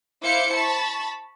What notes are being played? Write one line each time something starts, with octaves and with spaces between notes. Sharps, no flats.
E4 C5 F5 D6 G6 C#7
A5 B5 C#6